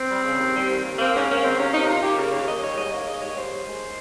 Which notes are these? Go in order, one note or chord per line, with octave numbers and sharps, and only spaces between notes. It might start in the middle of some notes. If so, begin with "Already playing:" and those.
Already playing: C4
G3
C#3
D#2
G3
D#2
D#2
A#3 C4
G#2 C#4
A#3 C#4
D#3 C4
C3 C#4
C3 D#4
A#3 F4
A#3 G4
C#3 A#4
D#2 C#5
D#2 D#5
G3 C#5
G#2 D#5
A#3 C#5
G#2 D#5
G3 C#5
D#2 C5
D#2
G#3